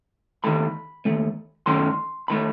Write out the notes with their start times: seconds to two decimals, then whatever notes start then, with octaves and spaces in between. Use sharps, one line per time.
0.44 D#2 D#3 A3 B5
1.05 D#2 D#3 A3
1.66 F#2 D#3 A3 C6
2.28 D#3 A3 B5